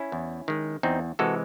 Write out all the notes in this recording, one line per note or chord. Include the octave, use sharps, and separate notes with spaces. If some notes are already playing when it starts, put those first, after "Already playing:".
Already playing: C#4 E4
E2
D#3 G#3
E2 C4 D#4
C3 E3 G#3 F#4 A4